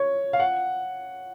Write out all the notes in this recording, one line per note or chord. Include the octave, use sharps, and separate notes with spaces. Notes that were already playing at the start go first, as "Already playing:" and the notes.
Already playing: C#5
F5
F#5